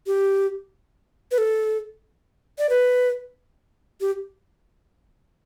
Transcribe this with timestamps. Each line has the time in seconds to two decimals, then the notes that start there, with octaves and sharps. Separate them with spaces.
0.07 G4
1.31 B4
1.38 A4
2.59 D5
2.70 B4
4.01 G4